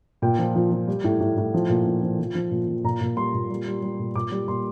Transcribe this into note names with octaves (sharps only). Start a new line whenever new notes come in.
A#2 G5
F3
F3
F3
G3
A2
A2
A2
F3
A#2
F3
F3
F3
F3
A#2
F3
A#2 A#5
A#2
G3 C6
A#2
G3
G3
G3
A#2
A#2 D6
G3
A#2 C6